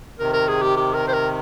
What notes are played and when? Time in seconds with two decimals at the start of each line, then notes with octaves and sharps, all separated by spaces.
0.19 C3 D#3 A#4
0.33 A#4
0.48 G#4
0.62 G4
0.76 G4
0.94 A#4
1.08 C5
1.13 A#4